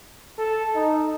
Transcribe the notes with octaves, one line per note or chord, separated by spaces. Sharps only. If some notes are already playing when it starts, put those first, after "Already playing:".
A4
D#4